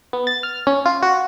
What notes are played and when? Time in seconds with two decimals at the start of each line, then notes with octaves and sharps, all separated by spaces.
0.13 B3
0.27 A6
0.43 F6
0.67 C#4
0.86 F4
1.03 F#4